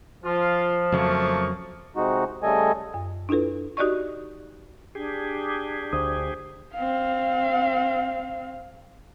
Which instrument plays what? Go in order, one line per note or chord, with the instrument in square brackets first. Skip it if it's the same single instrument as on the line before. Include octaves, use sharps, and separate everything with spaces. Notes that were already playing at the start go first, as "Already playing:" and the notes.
[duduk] F3 [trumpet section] F4
[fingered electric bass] F2 C#3 F#3 [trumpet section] A3 A#3 C#6
[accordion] C3 G#3 D#4 F#4
C#3 G3 A3 A4 D#5 G#5
[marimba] F#2
D4 E4 F4 A4 B4
D#4 F#4 G4 D5 D#5 C#6
[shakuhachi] D4 [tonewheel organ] G4 G#4
[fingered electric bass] D2 [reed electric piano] C5 D#6
[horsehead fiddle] C4 F5